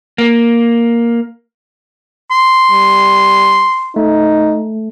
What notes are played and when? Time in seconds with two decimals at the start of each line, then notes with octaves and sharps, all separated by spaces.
0.18 A#3
2.31 C6
2.70 G3
3.96 A3 D#4